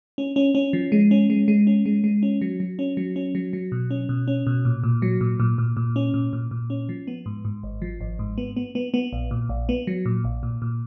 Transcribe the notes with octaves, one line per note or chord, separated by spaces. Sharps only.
C#4
C#4
C#4
F3
G#3
C#4
G#3
G#3
C#4
G#3
G#3
C#4
F#3
F#3
C#4
F#3
C#4
F#3
F#3
B2
C#4
B2
C#4
B2
A#2
A#2
F#3
A#2
A#2
A#2
A#2
C#4
A#2
A#2
A#2
C#4
F3
B3
G#2
G#2
G#1
F3
G#1
G#2
B3
B3
B3
B3
A#1
A#2
A#1
B3
F#3
A#2
A#1
A#2
A#2